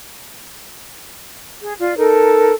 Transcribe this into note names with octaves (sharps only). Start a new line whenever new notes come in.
G#4
F4 D5
D#4 A4 A#4